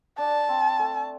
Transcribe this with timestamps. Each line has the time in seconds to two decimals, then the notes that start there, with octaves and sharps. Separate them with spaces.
0.18 D4 A5
0.49 C4
0.79 A3